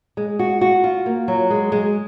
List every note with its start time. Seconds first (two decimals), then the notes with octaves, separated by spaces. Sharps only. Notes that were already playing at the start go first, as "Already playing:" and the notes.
0.17 G#3
0.39 F#4
0.61 F#4
0.84 F4
1.06 A#3
1.28 F#3
1.50 G#3
1.72 G#3